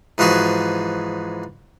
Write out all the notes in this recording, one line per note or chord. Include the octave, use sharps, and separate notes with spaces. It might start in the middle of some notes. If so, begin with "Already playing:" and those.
G#2 E3 F3 F#4 G#4